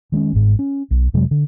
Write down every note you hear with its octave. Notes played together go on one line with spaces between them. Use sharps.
D#3 G#3 C4 C#4
G1 G#2
C#4
B1
F2 C3 F#3 G#3
D3